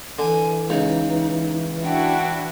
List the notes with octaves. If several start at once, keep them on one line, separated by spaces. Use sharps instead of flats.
D3 E3 G#5
C#2 D#4
D4 E4 F#4 G5